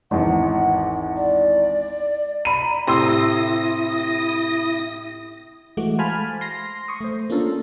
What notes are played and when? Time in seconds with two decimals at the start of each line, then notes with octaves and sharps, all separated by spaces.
0.11 G#1 E2 F#5
1.17 D5
2.45 A#5 B5 D#7
2.87 A2 C3 E4 C6 D#6 E6 A#6
5.77 E3 G#3 A3 F#4 D6
5.99 C5 F5 G#5 A5 B5 F6
6.41 C6 A#6
6.88 C6 C#6 D#6
7.01 A3 C5
7.30 A#3 C#4 D4 F4 A4 A#4